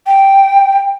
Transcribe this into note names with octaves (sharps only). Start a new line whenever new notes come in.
G5